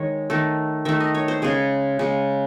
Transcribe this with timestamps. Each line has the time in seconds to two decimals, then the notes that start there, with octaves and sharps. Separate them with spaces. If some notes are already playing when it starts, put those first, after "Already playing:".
Already playing: D#3 G#3 C#5
0.30 D#3 A3
0.85 D#3 A3 E5
1.00 D#5
1.15 C#5
1.28 C5
1.42 C#3 G#3 G#4
1.99 C#3 G#3